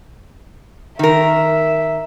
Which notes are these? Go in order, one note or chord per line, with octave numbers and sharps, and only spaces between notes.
D#3 A#4 E5